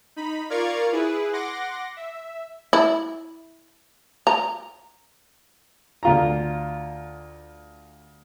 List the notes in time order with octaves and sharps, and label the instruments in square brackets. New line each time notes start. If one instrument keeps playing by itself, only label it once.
[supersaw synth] D#4 B5
F4 A#4 D5 F5 C#6 G#6
E4 G#4 B4
F#5 C6 D6 A#6
E5
[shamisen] E4
A#5
[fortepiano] D2 F4 A#5